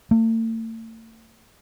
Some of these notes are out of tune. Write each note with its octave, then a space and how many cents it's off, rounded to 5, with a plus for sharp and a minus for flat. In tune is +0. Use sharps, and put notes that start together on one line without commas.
A3 +45